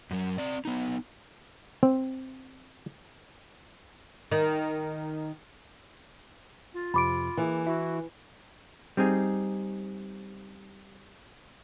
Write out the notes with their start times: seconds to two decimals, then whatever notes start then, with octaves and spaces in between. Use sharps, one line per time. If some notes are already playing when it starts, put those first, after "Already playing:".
0.11 F#2 F#3
0.38 C4 D5
0.65 B3 D#4
1.83 C4
4.32 D#3
6.74 F4
6.94 F2 C3 B5 D6 D7
7.37 E3 A#3 E4 G#4
7.67 E4 F#4
8.97 G3 C4 D#4 G#4